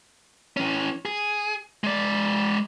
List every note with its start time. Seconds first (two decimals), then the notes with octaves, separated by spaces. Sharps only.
0.57 E3 C#4
1.05 G#4
1.84 G#3 D5